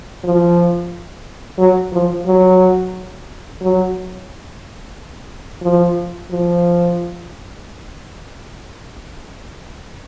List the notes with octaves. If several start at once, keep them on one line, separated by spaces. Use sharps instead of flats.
F3
F#3
F3
F#3
F#3
F3
F3